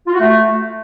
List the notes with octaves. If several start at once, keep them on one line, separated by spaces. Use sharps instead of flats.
F4
F#4
A3